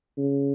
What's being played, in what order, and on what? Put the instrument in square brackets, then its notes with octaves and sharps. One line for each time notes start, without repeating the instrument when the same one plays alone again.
[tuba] C#3